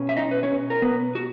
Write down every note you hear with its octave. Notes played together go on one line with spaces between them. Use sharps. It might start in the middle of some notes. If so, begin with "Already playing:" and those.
Already playing: B2 C#4
E5
D#4 D#5
B4
C#4 C#5
A#4
B3 B4
F#4